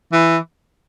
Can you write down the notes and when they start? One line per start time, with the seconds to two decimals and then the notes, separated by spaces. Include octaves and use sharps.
0.13 E3